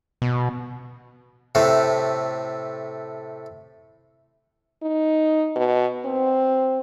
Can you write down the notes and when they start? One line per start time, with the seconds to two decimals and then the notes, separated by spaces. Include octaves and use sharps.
0.22 B2
1.55 A2 C3 A3
4.83 D#4
5.56 B2
6.05 C4